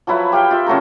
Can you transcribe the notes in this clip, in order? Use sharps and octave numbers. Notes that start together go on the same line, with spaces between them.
F3 F#3 E4 B4
G4 F5 G5
F4 E5
C#3 F#3 A3 A#4